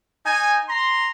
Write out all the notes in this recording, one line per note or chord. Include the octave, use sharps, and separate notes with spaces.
D#4 G#5
A#5 C6